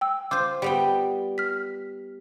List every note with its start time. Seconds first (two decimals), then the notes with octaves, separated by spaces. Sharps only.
0.01 G5 E6
0.31 F4 C5 D6 G6
0.62 G3 B3 G5
1.38 F6 B6